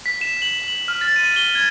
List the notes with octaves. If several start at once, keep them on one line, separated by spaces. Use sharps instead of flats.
B6
E7
F#7
F#7
F6
A6
D#7
G7
G#6